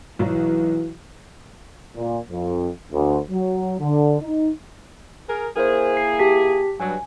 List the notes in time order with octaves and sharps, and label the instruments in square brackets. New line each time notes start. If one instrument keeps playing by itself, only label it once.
[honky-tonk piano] B1 F#3 [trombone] E3
[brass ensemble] A#2
F2
D2
F#3
D3
D#4
[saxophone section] G#4 A#4
[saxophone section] A#3 E4 G#4 [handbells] A#4 C5
[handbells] C7
G4 A5 B6
[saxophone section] G2 F#3 [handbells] G#5